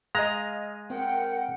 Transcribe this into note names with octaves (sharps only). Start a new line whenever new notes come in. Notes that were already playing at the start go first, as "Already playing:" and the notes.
G#3 D#5 F5 A#5
C4 A#4 F#5 G5